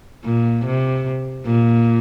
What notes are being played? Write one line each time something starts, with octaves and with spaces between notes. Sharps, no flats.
A#2
C3
A#2